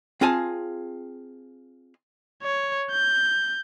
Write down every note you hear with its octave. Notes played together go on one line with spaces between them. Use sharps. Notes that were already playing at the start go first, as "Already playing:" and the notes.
C4 F4 G#4 G#5 A5
C#5
G6